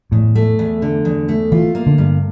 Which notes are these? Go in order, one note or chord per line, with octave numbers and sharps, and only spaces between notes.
E2 A2
A3
E2
D3
E2
A3
E3 F4
A#3
D3
G2